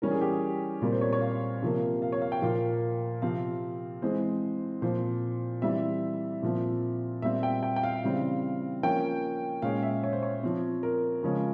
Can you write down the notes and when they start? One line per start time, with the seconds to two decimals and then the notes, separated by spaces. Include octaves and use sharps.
0.02 E3 G3 C#4 A#4
0.11 G#4
0.21 G4
0.32 G#4
0.82 A#2 G3 C4 A#4
0.92 C5
1.01 C#5
1.13 C#5
1.21 F5
1.63 C3 F3 A#3
2.02 F5
2.12 C#5
2.22 F5
2.32 G5
2.42 A#2 F3 A#3 F5
3.22 C3 F3 C4 F5
4.02 E3 G#3 C4 C5
4.82 A#2 F3 C4 C5
5.62 E3 G3 C4 E5
6.42 A#2 F3 C4
7.22 A#2 G3 C4 E5
7.43 G5
7.63 G5
7.76 G5
7.83 F5
8.03 C#3 E3 G3 C4
8.83 F3 A#3 C#4 G5
9.62 A#2 G#3 C#4 F5
9.83 E5
10.03 C#5
10.13 C5
10.23 C#5
10.43 F3 C4
10.83 A#4
11.23 C#3 F3 G#3 C#4